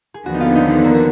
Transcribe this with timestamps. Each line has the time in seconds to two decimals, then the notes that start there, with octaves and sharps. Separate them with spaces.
0.14 G#4
0.26 D#2 D3 F3 B3 F#4
0.34 D#4
0.40 F4
0.55 D#4
0.70 D4
0.84 A#3
0.94 F#4